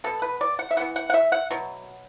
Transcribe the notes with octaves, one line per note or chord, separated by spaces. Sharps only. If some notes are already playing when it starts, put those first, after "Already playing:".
B2 B3 A4
B4
D5
F#5
E5
E3 B3 F#5
F#5
F#5
E5
F#5
B2 F#3